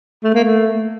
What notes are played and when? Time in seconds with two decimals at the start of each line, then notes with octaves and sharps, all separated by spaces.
0.24 A3
0.34 A#3
0.44 A3